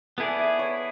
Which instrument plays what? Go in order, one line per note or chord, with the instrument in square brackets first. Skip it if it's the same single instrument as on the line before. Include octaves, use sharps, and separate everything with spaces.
[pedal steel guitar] B3 E4 G#4 D5 [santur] A4
[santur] E5
C#5